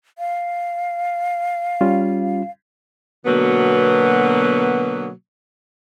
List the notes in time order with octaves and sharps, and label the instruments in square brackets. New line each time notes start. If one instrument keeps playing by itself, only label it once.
[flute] F5
[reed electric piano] G3 C#4 F4
[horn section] B2 D3 F#3 A#3 B3